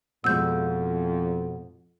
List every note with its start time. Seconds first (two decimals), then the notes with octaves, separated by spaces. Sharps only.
0.24 F2 B2 G#3 E6 G6